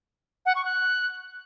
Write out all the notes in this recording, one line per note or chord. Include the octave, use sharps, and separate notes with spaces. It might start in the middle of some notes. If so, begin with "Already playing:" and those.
F#5
C#6
F#6